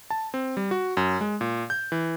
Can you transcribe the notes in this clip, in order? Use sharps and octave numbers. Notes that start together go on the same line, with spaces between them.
A5
C4
G3
F#4
F#2
G#3
A#2
G6
E3